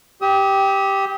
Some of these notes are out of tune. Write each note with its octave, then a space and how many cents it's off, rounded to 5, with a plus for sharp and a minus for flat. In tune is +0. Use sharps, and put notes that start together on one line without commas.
G4 +0 D#6 +40